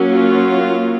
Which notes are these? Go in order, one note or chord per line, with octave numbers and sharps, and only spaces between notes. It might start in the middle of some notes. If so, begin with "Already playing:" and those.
Already playing: F#3 A#3 C#4
F4